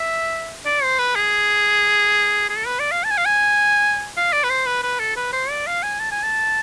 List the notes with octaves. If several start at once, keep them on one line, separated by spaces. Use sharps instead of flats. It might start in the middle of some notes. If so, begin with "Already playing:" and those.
Already playing: E5
D5
C5
B4
G#4
G#4
A4
B4
D5
F5
A5
G#5
F5
G#5
F5
D5
B4
C5
B4
B4
A4
B4
C5
D5
F5
G#5
A5
G#5
A5